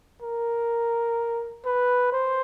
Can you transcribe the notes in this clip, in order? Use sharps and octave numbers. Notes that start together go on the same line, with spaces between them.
A#4
B4
C5